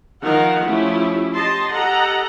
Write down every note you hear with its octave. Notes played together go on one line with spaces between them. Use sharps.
D#3 F3 D#4 A#4 F5 F#5
F3 A3 C#4 E4 G4
G4 D#5 A5 C6
G4 A4 D#5 F#5 A#5